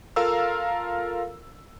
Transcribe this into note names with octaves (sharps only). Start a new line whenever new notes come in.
F4 A4 A#4 F5 A#5 E6